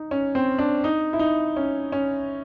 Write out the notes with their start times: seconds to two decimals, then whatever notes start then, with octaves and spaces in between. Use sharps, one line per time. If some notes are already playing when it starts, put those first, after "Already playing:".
Already playing: D#4
0.11 C#4
0.35 C4
0.59 D4
0.84 D#4
1.13 E4
1.19 D#4
1.56 C#4
1.92 C#4